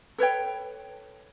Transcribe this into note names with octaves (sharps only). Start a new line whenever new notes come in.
A4 B4 C#5 G5